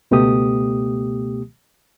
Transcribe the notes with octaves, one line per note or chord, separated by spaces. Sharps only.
C#2 B2 A3 B3 G4 D#6